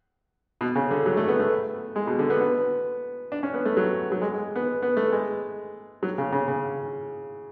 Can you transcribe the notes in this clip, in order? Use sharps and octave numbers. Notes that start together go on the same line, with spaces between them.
B2
C#3
D3
F#3
A3
B3
A3
G#3
B2
D3
B3
B3
D4
C#4
B3
A3
F#3
F#3
G#3
G#3
B3
B3
A3
G#3
F#3
C#3
C#3
C#3